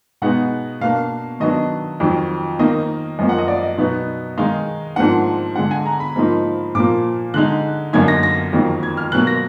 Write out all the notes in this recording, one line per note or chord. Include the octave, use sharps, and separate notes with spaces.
B2 G#3 B3 D#4 F#5
B2 A#3 D4 F5
D#3 F#3 B3 D4 D#5
F2 D#3 F#3
D#3 A#3 D#4 D#5
F#2 F3 A#3 D#5
F#5
D#5
D5
D#5
B2 F#3 B3 D#4
D#3 G#3 D#4 F5
G#2 F3 A#3 D4 F#5
D3 G#3 D4 F#5
G#5
A#5
B5
G#2 F3 A#3 D#4
A#2 F3 A#3 D6
D3 G#3 D#4 F#6
F#2 D3 F#3 A#3 D#4 G#6
A#6
A#6
F2 D#3 F#3 A#3
G#6
F6
B2 F#3 A#3 F#6
A#6